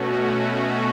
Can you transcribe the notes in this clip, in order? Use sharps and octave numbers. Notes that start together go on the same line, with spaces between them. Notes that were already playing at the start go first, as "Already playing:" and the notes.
Already playing: B2 A3 C#4 F#4